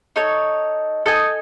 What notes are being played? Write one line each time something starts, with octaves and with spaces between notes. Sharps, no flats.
D#4 A4 C#5
D#4 A4 D#5 G#5